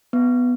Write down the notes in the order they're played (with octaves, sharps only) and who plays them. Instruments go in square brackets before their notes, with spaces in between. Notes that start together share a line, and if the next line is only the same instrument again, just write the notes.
[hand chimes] B3